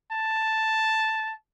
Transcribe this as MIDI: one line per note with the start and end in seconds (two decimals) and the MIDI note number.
0.11 1.33 81